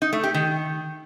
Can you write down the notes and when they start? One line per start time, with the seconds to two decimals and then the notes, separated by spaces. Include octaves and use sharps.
0.02 D#4
0.13 A3
0.24 G4
0.34 D#3